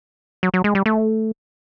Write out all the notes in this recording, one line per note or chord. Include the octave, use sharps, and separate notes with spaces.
F#3
F#3
G#3
G3
A3